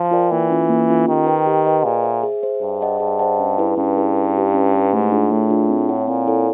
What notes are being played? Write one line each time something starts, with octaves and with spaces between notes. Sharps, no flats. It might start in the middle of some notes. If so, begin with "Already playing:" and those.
Already playing: F3
F4 A#4 D5 G5
E3 A#3
C#4 F4 A4
A#3
C#4 F4 A4
D#3 G4
B4 D#5 G5
G4
B4 D#5 G5
A#2 G#4
C5 E5
G#4
C5 E5
G2 G#4
C5 D#5 F#5 A5
G2 G#4
C5 D#5 F#5 A5
C#4
E4 G#4 B4
G2 C#4
E4 G#4 B4
C#4
E4 G4 B4
C#4
E4 G4 B4
G#2 A3
D4 F4 G#4
A2 A3
D4 F4 G#4
C4
E4 A4 C#5 F#5
A#2 C4
E4 A4 C#5 F#5